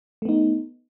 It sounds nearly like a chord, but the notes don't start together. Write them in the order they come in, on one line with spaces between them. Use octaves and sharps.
A3 B3 D#4